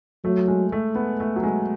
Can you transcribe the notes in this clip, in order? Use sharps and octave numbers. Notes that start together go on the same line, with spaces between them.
F#3 A3
G#3
A3
B3
A3
F#3
G#3